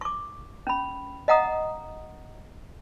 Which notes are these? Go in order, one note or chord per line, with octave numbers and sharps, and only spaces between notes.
C#6 D6
C#4 B5
D#5 F5 F#5 A#5 D#6